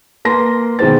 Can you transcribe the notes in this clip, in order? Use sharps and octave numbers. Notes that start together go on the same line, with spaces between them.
A#3 B4 C6 A#6
B2 D#3 G#3 C5 A6